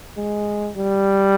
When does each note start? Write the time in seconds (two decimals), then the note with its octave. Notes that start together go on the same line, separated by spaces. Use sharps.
0.17 G#3
0.77 G3